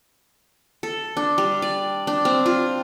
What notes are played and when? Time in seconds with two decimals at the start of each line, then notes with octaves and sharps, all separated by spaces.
0.83 A4
1.17 D4
1.38 G3
1.62 D5
2.07 D4
2.25 C4
2.46 F4